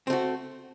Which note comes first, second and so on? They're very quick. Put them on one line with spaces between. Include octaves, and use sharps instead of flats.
C4 A3 F#4